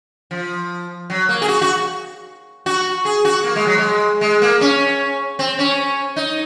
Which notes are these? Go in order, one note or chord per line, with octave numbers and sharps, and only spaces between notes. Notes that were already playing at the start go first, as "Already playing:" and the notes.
F3
F#3
A#3
G#4
F#4
F#4
F#4
G#4
F#4
A#3
G#3
F#3
G#3
G#3
A#3
C#4
C4
C#4
D#4